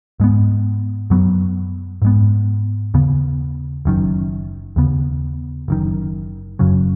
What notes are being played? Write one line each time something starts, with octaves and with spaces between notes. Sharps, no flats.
G#2 G#3 B3
F#2 F#3 B3
G#2 G#3 B3
D#2 C#3 B3
F#1 F#2 D#3
D#2 C#3 B3
F#1 F#2 D#3
F#1 F#2 C#3 F#3